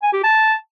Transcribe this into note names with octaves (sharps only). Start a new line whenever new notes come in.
G#5
G4
A5